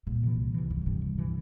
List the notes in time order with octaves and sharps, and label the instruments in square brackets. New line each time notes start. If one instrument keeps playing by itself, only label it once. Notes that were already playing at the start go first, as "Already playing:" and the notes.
[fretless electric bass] C2 [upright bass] A#2
[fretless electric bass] C3 E3
C2
C3 E3
[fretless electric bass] C2 [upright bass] G#2
[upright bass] G2 [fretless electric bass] C3 E3
[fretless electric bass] C2
C3 E3